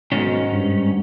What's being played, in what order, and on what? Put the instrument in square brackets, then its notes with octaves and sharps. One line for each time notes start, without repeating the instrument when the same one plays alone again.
[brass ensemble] B1 [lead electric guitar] G#2 D#3 [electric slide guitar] C#4
[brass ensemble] G2